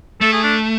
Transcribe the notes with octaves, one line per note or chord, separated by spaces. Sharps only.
A3 A4
G#4
D4